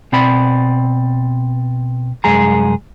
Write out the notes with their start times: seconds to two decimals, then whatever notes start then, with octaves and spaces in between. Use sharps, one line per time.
0.12 B2 C4 D5 B5
2.24 C2 F#2 G#3 G#4 A#5